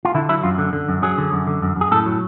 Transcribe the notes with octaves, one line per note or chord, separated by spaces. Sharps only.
F4
D3 E4
F#3 E4
F#2 F4
D3
D3
F#2
F#3 G#4
D3
F#2
D3
F#2
F#2 G#4
A2 A4
F#3